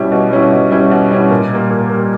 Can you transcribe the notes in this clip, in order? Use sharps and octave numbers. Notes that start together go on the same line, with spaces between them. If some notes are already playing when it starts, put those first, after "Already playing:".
Already playing: B2 G3 C#4 E4
B2
G3 C#4 E4
B2
G3 C#4 E4
B2
G3 C#4 E4
A#2
G3 A#3
A#2
G3 A#3